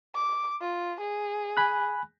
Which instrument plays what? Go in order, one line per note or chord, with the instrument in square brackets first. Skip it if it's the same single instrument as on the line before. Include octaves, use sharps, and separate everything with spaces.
[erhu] D6
F4
G#4
[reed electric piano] G#5 B5 F#6